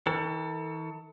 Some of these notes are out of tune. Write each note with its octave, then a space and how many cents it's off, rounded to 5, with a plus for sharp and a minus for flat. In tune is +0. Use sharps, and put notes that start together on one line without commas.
E3 -45 A4 +30